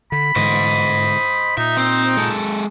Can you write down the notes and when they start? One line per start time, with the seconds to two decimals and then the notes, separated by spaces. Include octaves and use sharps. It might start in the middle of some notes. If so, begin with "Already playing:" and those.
0.12 D3 B5
0.36 G#2 D3 E3 C5 D#5
1.57 A#2 D#4 E5
1.77 C4 C5
2.17 G#3 A4